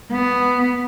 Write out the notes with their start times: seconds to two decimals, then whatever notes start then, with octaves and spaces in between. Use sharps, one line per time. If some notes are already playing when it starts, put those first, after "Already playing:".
0.12 B3